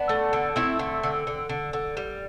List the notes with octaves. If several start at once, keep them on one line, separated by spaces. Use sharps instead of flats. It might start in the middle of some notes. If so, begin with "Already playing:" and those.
Already playing: B3 D4
A3
D3
A3 C4 E4
D3
D3
D3
D3
D3
G3